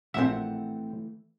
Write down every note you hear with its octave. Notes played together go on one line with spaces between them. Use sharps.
A#1 E3 A3 C4 E5 F#5